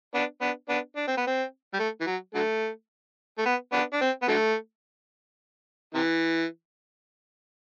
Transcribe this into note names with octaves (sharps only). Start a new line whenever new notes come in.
B3 D4
B3 D4
B3 D4
D4
C4
B3
C4
G3
A3
E3
F#3
D3 F#3 A3
A3
B3
B3 D4
D4
C4
B3
D3 F#3 A3
C3 E3